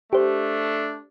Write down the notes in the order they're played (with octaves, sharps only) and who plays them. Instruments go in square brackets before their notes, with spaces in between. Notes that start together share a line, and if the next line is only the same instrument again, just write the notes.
[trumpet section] A3 D4 [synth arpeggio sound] G4 C5